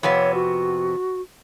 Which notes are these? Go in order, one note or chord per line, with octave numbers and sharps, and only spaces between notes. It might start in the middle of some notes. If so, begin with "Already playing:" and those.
F2 C3 B3 C#5
F#4